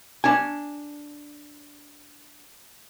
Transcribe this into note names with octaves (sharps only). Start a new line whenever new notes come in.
D4 G#5